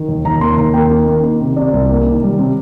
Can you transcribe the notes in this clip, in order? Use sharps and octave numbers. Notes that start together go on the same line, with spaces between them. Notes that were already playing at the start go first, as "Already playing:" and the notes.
Already playing: D#3
D#2
D#2 A#5
A#3 C6
D#2 A#5
A#3 G5
D#3
A#3
D#3
C3
C3 D5
C2
A#3
D#3
G3
C3